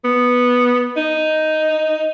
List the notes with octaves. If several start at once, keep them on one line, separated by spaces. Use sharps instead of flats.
B3
D#4